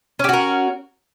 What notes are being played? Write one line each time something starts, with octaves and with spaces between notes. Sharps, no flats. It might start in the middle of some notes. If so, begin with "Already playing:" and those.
C#4 F#4 G4 A#4